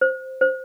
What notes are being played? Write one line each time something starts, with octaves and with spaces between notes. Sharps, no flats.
C5
C5